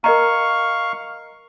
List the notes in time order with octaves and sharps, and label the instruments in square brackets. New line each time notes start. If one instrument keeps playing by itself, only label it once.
[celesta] A#4 D#5 A#5 [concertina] F5 C#6